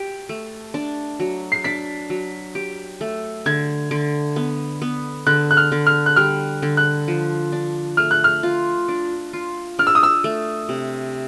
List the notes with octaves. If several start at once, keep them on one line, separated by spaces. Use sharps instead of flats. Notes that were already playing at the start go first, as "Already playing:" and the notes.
Already playing: G4
A3
D4
F#3
C7
D4 B6
F#3
G4
A3
D3 G#6
D3
B3
B3
D3 F#6
F#6
F6
D3
F6
F#6
G3 F6
D3
F#6
F3
D4
A3 F6
F#6
F6
F4
D4
F4
D4 F6
E6
D#6
E6
A3
C3